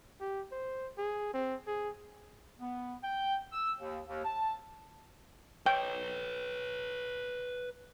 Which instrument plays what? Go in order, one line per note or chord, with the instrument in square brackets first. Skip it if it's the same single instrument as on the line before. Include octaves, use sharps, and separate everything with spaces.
[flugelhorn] G4
C5
G#4
C4
G#4
[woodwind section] B3
G5
E6
D#2
D#2
A5
[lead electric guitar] B4 C#5 [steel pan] G5